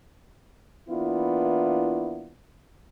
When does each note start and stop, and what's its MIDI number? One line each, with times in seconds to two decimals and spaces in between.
0.89 2.31 52
0.89 2.31 58
0.89 2.31 59
0.89 2.31 62
0.89 2.31 64
0.89 2.31 65